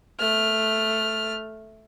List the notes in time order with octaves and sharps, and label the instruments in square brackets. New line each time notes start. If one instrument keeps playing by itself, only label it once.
[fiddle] A3 F6